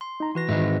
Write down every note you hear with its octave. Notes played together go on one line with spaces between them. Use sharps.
C6
D#4 A#5
E3 F#4 B4 A#6
G#2 D#3 B4 D#5 E5